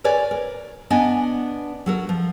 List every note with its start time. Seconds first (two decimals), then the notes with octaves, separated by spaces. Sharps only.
0.04 A#4 B4 C#5 D5 G#5
0.31 A#4
0.90 B3 D4 D#5 G#5
1.86 F#3 A4 A#4
2.09 F3